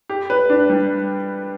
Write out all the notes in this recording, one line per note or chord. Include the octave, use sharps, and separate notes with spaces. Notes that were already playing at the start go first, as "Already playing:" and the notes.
G4
B4
D4
G3